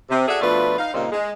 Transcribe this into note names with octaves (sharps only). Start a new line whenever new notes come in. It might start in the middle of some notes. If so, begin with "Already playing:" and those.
C3
F#4 G#4 A4 D5 E5
B2 F3 A3 D4 F4 B4
D#4 F5
A#2 C#3 G3 A#3 C4 D#4
G#3